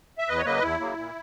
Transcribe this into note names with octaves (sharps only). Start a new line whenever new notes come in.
E5
E2 B4 D#5
C#5
C#3 F#3 A#3 B4 D#5
E2 E4
C#3 F#3 A#3
A#2